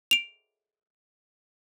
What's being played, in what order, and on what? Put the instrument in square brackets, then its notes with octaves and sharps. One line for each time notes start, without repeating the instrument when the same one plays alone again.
[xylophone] D7 F7